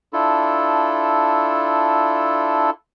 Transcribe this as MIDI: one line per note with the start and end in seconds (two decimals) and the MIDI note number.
0.13 2.70 62
0.13 2.70 64
0.13 2.70 65
0.13 2.70 69